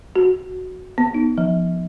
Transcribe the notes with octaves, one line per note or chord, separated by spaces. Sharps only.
F#4
B3
D#4
F3